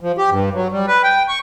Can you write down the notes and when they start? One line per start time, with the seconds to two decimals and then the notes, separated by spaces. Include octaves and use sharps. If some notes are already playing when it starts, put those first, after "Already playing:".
0.01 F3
0.18 G4
0.31 G2
0.54 F#3
0.72 G3
0.87 B4
1.04 G5
1.28 C#6